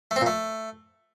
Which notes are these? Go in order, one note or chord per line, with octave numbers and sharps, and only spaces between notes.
A3
C4
A#2
A3